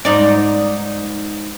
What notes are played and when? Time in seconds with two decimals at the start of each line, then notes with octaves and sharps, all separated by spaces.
0.05 G#2 D#4 D5